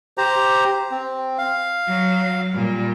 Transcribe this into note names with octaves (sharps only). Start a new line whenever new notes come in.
G4 C5 A#5
C4
F5
F#3
A#2 G3